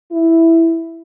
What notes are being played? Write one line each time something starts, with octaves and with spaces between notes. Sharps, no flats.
E4